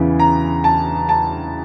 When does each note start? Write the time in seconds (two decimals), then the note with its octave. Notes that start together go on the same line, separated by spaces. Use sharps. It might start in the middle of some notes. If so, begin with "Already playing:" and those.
Already playing: E2 C#3 E3
0.20 A#5
0.64 A5
1.09 A5